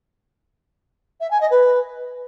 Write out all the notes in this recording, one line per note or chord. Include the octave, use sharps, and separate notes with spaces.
E5
G#5
D#5
B4